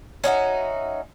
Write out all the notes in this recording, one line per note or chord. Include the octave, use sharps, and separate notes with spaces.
C#4 D#4 F#4 E5